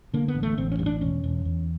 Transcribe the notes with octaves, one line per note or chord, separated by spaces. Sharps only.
D3 A#3
B3
A1
A3
A1 C4
C#4
G2
D4
E1 C#4
E1
E2